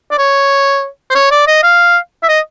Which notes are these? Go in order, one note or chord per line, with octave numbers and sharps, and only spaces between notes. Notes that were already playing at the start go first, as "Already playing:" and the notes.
D5
C#5
C5
C#5
D5
D#5
F5
E5
D#5